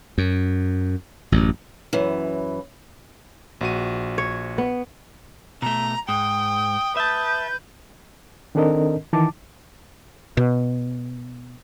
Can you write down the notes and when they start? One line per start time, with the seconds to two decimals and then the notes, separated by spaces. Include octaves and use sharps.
0.18 F#2
1.32 A1 F#2
1.93 F#2 E3
3.61 A#1 F#4 D#7
4.18 C#5
4.58 B3
5.62 B2 A3 A#5
6.09 G#2 G5 D#6
6.97 B4 E5 A5 G6
8.55 D#3 C4 D4 A4 A#4 D#5
9.13 D#3 E3 A5 D6
10.37 B2